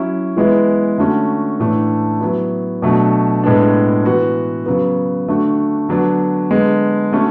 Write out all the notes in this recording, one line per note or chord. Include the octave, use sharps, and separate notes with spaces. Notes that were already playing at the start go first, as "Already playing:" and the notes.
Already playing: F#3 C#4 E4
E3 G#3 B3 E4
D3 A3 C#4 F#4
A2 E3 A3 D4
F#3 B3 E4
B2 F#3 A3 D4
A2 G#3 B3 D4
E3 B3 F#4
C#3 F#3 B3
D3 A3 D4 F#4
D3 F#3 B3 D4 F#4
D3 G#3 B3
D3 A3 C#4 F#4